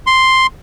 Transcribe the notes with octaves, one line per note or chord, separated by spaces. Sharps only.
C6